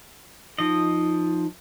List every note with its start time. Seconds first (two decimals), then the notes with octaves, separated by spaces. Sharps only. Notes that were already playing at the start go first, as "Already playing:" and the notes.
0.59 F3 D#4 D#5